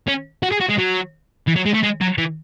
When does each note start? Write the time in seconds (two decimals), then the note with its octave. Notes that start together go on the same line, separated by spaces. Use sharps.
0.08 C#4
0.43 F#4
0.52 G#4
0.60 F#4
0.69 G#3
0.78 F#3
1.48 E3
1.56 F#3
1.66 G#3
1.74 A3
1.83 G#3
2.01 F#3
2.18 E3